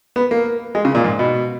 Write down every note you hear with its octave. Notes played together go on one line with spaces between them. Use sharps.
B3
A#3
G#3
C#3
A#2
G#2
B2